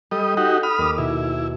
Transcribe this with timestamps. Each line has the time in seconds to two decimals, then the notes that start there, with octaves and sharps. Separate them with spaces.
0.11 G3 A4 D#5
0.37 D#4 F#4 G4
0.63 B5 D#6 F6
0.78 D#2 D#5 D6
0.98 B2 E4